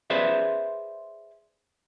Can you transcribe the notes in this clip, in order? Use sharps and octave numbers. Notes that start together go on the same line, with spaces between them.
G#4 B4 C5 D5 E5